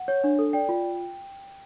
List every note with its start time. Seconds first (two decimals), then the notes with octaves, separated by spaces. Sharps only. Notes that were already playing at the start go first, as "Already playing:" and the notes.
Already playing: F#5
0.08 C#5
0.24 D4
0.39 A4
0.53 D5 G5
0.69 F4